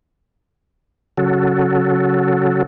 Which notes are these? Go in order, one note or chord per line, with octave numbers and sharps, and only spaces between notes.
C#3 F#3 F#4 A4